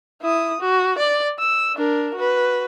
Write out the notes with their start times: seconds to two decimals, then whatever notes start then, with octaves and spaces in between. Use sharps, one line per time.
0.22 E4 D#6
0.60 F#4
0.98 D5
1.39 E6
1.76 D4 A#4
2.15 F#4 B4